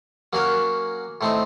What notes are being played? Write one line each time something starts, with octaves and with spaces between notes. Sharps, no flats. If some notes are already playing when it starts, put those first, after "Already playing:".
F#3 A#3 C#4 F#4 A#4
A2 A3 C4 D#4